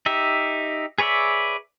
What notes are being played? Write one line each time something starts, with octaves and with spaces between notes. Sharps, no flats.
D#4 G4 E5
G#4 B4 C#5 D5 E5